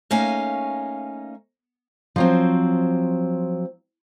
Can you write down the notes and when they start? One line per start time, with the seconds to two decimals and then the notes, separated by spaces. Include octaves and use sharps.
0.11 A3 A#3 C#4 D#4 F5 G#5
2.16 F3 F#3 C4